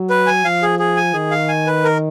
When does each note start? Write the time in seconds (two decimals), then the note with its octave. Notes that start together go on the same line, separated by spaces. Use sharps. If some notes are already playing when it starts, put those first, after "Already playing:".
Already playing: F#3
0.10 B4
0.26 G#5
0.45 F3 F5
0.62 G#4
0.79 G#4
0.97 G#5
1.14 D#3 G#4
1.31 F5
1.49 G#5
1.67 B4
1.84 A#4